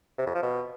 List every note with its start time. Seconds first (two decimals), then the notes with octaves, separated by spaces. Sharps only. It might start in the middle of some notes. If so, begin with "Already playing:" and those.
0.18 C3
0.26 F2
0.34 F3
0.42 B2